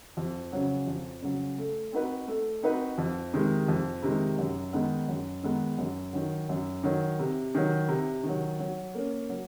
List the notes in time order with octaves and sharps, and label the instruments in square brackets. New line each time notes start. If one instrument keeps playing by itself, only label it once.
[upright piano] F2
C#3 F#3
F2
C#3 F#3
A3
C4 D#4 F#4 B4
A3
C4 D#4 F#4 B4
F2
C3 D#3 G#3
F2
C3 D#3 G#3
F#2
D#3 G#3 B3 D#4
F#2
D#3 G#3 B3 D#4
F#2
D#3 F#3
F#2
D#3 F#3
C3
D#3 F#3
C3
D#3
F#3
F#3
A#3 C#4
F#3